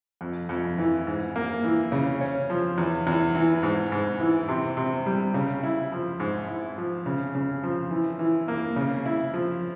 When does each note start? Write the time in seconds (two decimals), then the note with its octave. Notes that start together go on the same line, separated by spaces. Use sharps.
0.21 F2
0.49 F2
0.78 E3
1.07 G#2
1.36 A#3
1.64 E3
1.92 C#3
2.21 C#4
2.50 F3
2.78 E2
3.07 E2
3.35 E3
3.63 G#2
3.92 G#2
4.20 E3
4.49 C3
4.77 C3
5.06 G3
5.34 C#3
5.63 E4
5.92 F3
6.20 G#2
6.48 E4
6.78 F3
7.06 C#3
7.35 C#3
7.63 F3
7.91 E3
8.19 E3
8.48 A#3
8.76 C#3
9.06 E4
9.34 F3